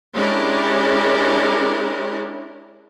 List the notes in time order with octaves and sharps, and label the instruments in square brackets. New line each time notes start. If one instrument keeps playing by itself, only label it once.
[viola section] G#3 C#4 D4 E4 G4 A#4